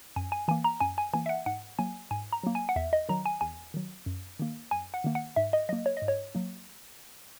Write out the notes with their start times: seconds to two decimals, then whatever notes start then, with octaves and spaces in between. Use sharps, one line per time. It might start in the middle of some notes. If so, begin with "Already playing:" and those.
0.16 F#2 G#5
0.32 G#5
0.48 E3 A#3 G#5
0.64 A#5
0.80 F#2 G#5
0.98 G#5
1.13 E3 A#3 G#5
1.26 E5
1.29 F#5
1.46 G#2 F#5
1.79 F#3 A#3 G#5
2.11 G#2 G#5
2.33 A#5
2.43 F#3 A#3
2.55 G#5
2.69 F#5
2.76 E2 E5
2.93 D#5
3.09 D#3 F#3 A#5
3.26 G#5
3.41 E2 G#5
3.74 D#3 F#3
4.06 F#2
4.39 D#3 A#3
4.71 F#2 G#5
4.94 F#5
5.04 D#3 A#3
5.15 F#5
5.36 G#2 E5
5.53 D#5
5.69 F#3 A#3 D#5
5.86 C#5
5.97 D#5
6.02 G#2
6.08 C#5
6.35 F#3 A#3